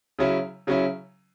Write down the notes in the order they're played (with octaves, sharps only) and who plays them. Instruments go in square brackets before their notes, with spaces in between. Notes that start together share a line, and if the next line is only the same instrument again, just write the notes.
[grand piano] C#3 F#3 C#4 E4
C#3 F#3 C#4 E4